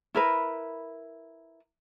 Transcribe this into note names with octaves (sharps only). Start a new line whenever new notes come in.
E4 A#4 B4